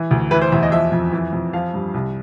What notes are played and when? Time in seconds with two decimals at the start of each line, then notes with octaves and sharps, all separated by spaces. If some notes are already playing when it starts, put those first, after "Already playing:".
Already playing: E3
0.11 D2
0.31 E3 B4
0.41 C5
0.52 E2 E5
0.63 D#5
0.72 F3 E5
0.92 F2
1.12 E3
1.33 F2
1.53 F3 F5
1.74 G2
1.94 C2